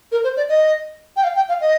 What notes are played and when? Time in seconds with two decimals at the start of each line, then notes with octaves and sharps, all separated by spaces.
0.12 A#4
0.24 C5
0.37 D5
0.49 D#5
1.16 G5
1.24 F5
1.36 G5
1.49 F5
1.61 D#5